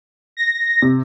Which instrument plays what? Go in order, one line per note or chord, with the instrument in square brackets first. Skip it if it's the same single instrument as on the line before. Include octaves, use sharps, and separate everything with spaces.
[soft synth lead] A#6
[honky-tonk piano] C3